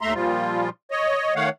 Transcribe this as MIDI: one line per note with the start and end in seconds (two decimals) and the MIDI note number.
0.01 0.14 39
0.01 0.14 57
0.01 0.14 76
0.01 0.14 82
0.01 0.14 84
0.14 0.69 46
0.14 0.69 53
0.14 0.69 55
0.14 0.69 65
0.91 1.34 73
0.91 1.34 75
1.35 1.49 51
1.35 1.49 57
1.35 1.49 73
1.35 1.49 77
1.35 1.49 78